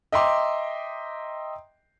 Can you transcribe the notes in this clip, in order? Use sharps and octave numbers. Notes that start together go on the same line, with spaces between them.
D#5 E5 G5 A#5 C6 D6